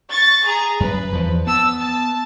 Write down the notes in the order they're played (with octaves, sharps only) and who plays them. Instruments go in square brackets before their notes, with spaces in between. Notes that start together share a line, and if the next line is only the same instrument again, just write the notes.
[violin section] C#6 A6
G#4 A#5
[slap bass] F#2 [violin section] B4
[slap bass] E2 F3
[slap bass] B3 [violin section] A5 E6
[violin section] A5